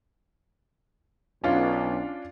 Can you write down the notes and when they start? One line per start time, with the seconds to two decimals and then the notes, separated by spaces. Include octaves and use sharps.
1.44 B1 C#4 D4 F4